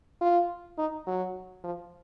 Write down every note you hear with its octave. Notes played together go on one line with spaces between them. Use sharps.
F4
D#4
F#3
F3